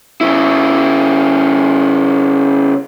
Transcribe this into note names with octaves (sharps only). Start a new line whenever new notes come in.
C#3 E4